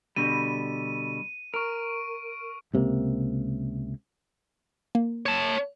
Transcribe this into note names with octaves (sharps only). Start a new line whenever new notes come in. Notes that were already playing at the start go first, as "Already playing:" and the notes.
B2 D3 G3 D#7
A#4 C#6 D7
C#2 C3 D#3 A#3
A#3
C#5 A5